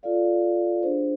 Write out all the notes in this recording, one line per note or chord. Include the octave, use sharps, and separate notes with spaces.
F4 A4 D5 F5
D4 G#4 C5